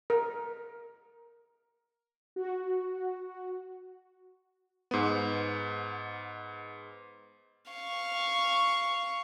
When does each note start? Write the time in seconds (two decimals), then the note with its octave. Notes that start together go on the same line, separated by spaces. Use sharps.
0.10 A#4
2.36 F#4
4.91 G#2 B3
7.72 F5 C#6